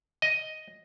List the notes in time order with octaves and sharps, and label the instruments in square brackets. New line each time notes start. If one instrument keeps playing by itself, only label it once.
[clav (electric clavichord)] D#5